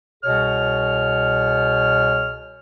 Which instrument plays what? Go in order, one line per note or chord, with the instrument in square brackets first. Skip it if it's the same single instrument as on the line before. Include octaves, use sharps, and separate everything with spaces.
[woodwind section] C2 B2 G#4 C#5 F6